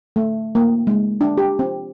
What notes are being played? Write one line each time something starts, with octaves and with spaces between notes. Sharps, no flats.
A3
A#3
G#3
D4
G4
C4